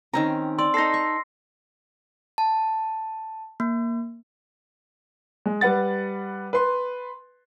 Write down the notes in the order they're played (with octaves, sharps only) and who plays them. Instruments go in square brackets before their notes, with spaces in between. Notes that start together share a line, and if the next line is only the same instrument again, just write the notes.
[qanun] D#3 C4 C#4 [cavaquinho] A#5
[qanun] D5 [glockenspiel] C6 E6
[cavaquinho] D#4 A4 [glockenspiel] A#6 C7
[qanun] C#6
[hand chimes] A5
A#3
[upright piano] G#3
G3 B4 F#5 A6
B4 C6